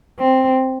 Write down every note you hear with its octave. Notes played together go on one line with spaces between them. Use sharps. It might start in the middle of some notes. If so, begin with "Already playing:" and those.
C4